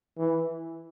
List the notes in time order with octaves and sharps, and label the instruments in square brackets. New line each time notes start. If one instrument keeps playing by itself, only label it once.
[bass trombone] E3